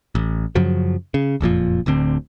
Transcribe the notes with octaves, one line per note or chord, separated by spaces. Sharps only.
A1
F#2 C#3 F3 F#3
C#3
F#1 F2 A#2 F3
D1 D2 D3 C4